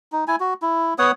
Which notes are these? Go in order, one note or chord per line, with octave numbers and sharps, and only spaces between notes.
D#4
E4 G#5
F#4
E4
B3 C#5 F#5 D#6